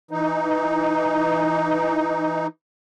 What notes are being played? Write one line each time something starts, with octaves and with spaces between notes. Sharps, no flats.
E3 D#4